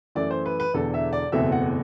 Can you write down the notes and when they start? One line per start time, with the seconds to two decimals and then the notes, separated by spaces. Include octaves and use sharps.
0.15 F#2 E3 A3 D5
0.31 C5
0.46 B4
0.60 B4
0.74 E1 E2 D3 A4
0.94 E5
1.13 D5
1.32 F#1 E2 B2 A3 C4 E5
1.52 F#5